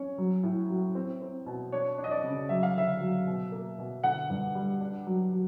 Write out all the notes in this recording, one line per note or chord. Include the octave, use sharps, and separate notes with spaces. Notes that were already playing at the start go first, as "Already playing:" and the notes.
Already playing: C#4 C#5
F#3
A2
F#3
C4
C4
B2
D4 C#5
D4
D#5
D5
C#3
F#3 E5
F5
D3 E5
F#3
B2
A#3
B2
D3 F#5
G2
G3
D4
F#3
F#3